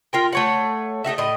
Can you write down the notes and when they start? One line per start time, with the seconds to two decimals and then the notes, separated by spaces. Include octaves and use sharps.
0.13 F4 A#4 G5
0.33 A3 C#5 F#5
1.04 A3 D#4 F#4 E5
1.18 A2 D#5